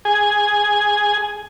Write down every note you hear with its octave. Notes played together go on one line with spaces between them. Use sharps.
G#4 G#5